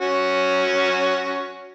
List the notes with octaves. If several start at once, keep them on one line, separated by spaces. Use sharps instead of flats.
C#4 F#4